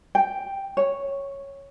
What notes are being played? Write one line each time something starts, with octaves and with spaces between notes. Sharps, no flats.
G5
C#5